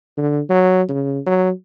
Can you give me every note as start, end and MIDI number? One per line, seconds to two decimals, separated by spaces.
0.17 0.41 50
0.49 0.83 54
0.89 1.19 49
1.26 1.51 54